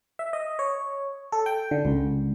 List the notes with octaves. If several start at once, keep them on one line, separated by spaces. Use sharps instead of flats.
E5
D#5
C#5
A4
G5
D3
C#2